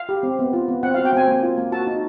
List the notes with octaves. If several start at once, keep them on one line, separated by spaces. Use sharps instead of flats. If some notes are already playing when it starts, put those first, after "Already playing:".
Already playing: F5
G4
C4
B3
F4
B3
C4 F#5
F5
F#4
G5
C4 G#5
A#3
F4
A#3
F#4 A5
D#4